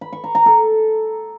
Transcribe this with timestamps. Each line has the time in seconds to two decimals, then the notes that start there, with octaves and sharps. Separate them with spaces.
0.01 B5
0.13 C#6
0.24 A#5
0.35 A#5
0.46 A4